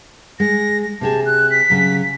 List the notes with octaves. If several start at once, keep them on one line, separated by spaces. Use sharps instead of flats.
G#3 A#6
C3 G4 G#4 A5
F#6
B6
C#3 F#3